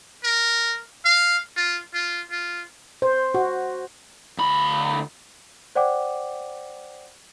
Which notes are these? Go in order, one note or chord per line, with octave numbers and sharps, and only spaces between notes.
A#4
F5
F4
F4
F4
C5
F#4
D2 B5
C5 D5 F#5 G5 D6